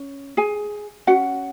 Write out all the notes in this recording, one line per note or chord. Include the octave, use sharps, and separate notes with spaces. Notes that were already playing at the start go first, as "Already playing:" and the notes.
Already playing: C#4
G#4 G#5
C#4 F#4 F#5